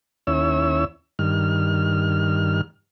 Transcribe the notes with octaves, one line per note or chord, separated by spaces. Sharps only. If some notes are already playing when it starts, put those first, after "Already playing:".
D#2 C#4 E4 C#5 E6
G2 D#3 F6